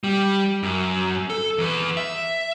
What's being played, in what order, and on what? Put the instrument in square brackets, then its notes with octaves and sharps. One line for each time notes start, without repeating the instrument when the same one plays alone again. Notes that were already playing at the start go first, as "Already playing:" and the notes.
[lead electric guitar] G3
F#2
A4
E2 B4
E5